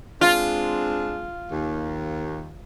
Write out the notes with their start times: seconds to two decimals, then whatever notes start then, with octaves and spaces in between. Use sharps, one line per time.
0.21 G#3 C4 D4 F4
1.51 D#2